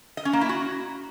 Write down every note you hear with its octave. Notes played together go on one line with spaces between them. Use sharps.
D#5
C#4
A#3
E4
F#4